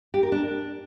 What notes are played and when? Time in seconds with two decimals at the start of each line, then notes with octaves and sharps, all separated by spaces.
0.14 G4
0.23 A#4
0.32 D4